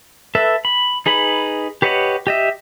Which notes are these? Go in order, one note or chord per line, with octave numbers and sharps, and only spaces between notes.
A4 B4 E5
B5
D#4 G#4 B4 B5
G4 B4 C#5 D#5 F#5
G4 D#5 E5